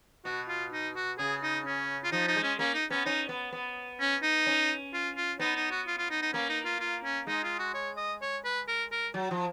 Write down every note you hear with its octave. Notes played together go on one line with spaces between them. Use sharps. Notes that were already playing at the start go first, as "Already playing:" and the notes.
B2 F#4
F4
D#4
F#4
C#3 G#4
D#4
C#4
F4
F3 D#4
D#4
G#3
C#4
A#3 C#4
D#4
B3 C#4
C#4 D#4
B3
B3
C#4
D#4
C#4
F4
F4
B3 D#4
D#4
F#4
F4
F4
D#4
D#4
A#3 C#4
D#4
F4
F4
C#4
G#3 D#4
F4
F#4
C#5
D#5
C#5
B4
A#4
A#4
F#3
F3